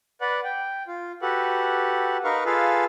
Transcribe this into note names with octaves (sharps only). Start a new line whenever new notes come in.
B4 D5 F#5
G5
F4
F#4 G4 A4 B4 F#5
D#4 A#4 B4 F5 C#6
F4 G#4 A4 B4 F5